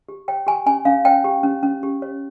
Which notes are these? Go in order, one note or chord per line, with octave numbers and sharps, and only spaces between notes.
G4
C#5 G5
G4 G#5
C#4 G#5
C#4 F5
C#5 G5
G4
C#4
C#4
G4
C#5